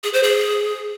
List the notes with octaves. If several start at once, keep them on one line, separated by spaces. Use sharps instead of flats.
G#4
C5
G#4